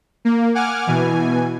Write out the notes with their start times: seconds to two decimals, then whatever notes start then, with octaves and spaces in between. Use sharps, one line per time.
0.25 A#3
0.55 F#5 G#5 D6 F6
0.86 B2 E3 G#5